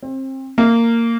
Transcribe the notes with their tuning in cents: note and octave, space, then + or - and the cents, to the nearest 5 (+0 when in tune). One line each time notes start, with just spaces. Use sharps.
C4 +25
A#3 -15